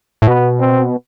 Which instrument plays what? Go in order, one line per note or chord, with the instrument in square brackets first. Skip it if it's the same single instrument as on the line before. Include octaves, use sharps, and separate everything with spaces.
[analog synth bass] A2
[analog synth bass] B2 [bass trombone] B3
[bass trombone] C4